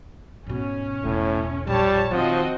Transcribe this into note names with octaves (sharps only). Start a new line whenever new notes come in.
G#2 B2 C#4
E1 A2
A#1 G3 C#5 A5
D#3 F3 C4 F#4 D#5